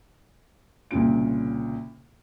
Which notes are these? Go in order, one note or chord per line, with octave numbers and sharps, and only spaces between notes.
C2 A#2 C#3 C#4 F4 D7